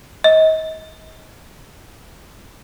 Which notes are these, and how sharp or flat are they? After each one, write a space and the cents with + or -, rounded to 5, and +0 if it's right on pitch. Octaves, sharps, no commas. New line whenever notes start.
D#5 +35